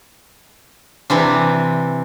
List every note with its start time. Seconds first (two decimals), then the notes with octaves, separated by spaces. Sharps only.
1.10 C3 E3 C4 D4